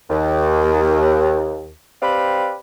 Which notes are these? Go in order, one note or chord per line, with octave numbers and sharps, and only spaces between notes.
D#2
C4 G4 B4 D5 F5 B5